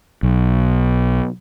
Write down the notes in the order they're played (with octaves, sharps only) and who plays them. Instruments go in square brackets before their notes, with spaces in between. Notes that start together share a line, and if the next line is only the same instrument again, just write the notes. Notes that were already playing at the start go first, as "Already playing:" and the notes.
[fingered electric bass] B1